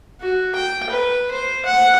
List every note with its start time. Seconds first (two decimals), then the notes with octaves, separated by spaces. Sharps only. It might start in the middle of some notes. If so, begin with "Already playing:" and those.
0.21 F#4
0.55 G5
0.90 B4
1.31 C5
1.66 F#5